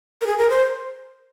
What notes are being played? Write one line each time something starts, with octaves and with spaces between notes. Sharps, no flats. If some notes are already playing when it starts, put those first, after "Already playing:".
A#4
G#4
A#4
C5